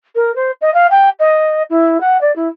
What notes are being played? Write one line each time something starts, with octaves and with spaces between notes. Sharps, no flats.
A#4
C5
D#5
F5
G5
D#5
E4
F#5
D5
E4